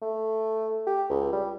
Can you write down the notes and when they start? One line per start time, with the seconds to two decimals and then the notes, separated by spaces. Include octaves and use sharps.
0.02 A3
0.87 G4
1.10 C#2
1.32 G3